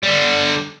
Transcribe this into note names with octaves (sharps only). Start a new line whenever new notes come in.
D3 G3